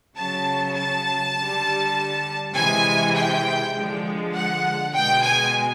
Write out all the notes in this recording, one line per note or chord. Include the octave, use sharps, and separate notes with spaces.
C#3 F#3 A5
A5
D3 G3
C3 E3 G#3 G#5
G5
D3 F3 G#3
F#5
B2 G#3 G5
G#5